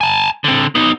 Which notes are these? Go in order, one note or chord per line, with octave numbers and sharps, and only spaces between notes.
G#5 A5
D3 C4
B3 D#4